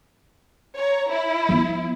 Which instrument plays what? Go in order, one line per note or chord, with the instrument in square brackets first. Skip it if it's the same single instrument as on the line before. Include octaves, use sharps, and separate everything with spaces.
[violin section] C#5 A#5
E4
[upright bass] F3 B3